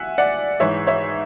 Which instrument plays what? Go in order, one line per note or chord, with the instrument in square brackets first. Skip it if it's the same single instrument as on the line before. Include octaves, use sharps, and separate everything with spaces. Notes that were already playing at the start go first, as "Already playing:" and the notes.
Already playing: [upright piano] E5 F#5 G#5
D5 F#5
G#2 E3 G#3 C#5 E5
C#5 E5